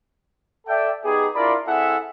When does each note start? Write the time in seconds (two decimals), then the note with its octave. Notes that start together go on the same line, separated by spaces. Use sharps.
0.67 A4 D5 E5 G5
1.04 B3 D#4 G4 G#4
1.35 D4 E4 F4 A#4 D5 B5
1.66 C4 E4 G#4 A4 E5 F#5